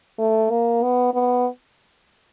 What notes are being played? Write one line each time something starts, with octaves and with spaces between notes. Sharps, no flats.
A3
A#3
B3
B3